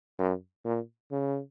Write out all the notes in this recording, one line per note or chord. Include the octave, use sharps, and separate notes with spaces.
F#2
A#2
C#3